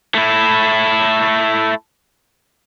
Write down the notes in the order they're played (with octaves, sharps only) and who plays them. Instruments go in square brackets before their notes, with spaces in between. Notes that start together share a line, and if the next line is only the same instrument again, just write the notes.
[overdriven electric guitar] A3 E4